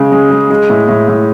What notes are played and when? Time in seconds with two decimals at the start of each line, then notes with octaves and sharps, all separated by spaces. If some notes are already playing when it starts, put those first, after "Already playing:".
Already playing: C#3 G#3
0.12 G#3
0.31 G#3
0.50 G#3
0.70 A2
0.89 A2
1.08 A2